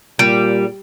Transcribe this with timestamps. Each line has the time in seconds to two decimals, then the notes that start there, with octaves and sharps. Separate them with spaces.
0.19 A#2 G3 D7